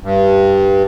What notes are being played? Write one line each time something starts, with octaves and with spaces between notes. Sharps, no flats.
G2